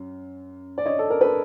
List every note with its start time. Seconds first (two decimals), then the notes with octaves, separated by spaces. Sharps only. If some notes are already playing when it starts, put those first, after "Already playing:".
Already playing: F#2
0.78 D5
0.86 C#5 D#5
0.99 A4
1.10 A#4
1.21 A4 B4